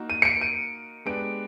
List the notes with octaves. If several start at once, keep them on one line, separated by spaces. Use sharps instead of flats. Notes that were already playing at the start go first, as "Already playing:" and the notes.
Already playing: A#3 D#4 F#4 A#4
D#7
C#7
D7
D#7
G#3 B3 D4 G4 B4 D7